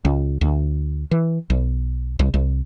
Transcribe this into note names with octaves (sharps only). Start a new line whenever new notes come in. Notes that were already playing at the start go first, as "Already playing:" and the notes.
C#2
D2
E3
B1
C2
C2